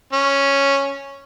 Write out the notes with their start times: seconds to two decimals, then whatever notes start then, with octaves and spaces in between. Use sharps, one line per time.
0.13 C#4